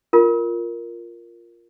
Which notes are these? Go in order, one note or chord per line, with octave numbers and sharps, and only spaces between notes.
F4 A#4